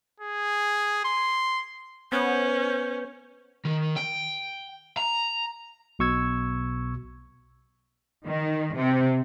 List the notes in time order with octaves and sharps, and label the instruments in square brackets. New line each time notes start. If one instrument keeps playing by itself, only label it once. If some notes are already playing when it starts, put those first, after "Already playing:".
[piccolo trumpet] G#4
C6
[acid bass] B3 [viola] C#4 [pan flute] C5
[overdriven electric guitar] D#3
G5
A#5
[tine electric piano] B1 B2 C#6 E6 G#6
[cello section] D#3
C3